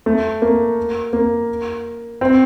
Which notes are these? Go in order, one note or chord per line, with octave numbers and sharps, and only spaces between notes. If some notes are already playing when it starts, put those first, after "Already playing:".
A3
A#3
A#3
C4